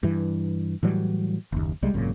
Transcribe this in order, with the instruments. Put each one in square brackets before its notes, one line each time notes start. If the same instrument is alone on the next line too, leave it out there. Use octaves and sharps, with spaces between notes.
[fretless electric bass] G2 E3
A2 E3 F#3 G3
F#1 D#2
C2 G3 G#3
G#1 F#2 A#2 C#3